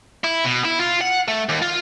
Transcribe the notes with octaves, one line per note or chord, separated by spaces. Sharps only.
E4
B2
E4
F4
F#5
A3
D#2
F4